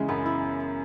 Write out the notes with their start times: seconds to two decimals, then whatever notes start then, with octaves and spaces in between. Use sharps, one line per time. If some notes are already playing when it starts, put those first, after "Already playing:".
Already playing: C#3 E3 G#3
0.08 F#2 B3
0.26 E4